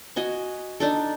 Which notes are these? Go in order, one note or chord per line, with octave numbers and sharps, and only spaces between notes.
F#4 D#5 G#5
D4 D#4 A4